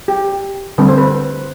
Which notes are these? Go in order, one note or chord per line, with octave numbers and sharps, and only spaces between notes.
G4
D3 G3 C4 B4
C5
B4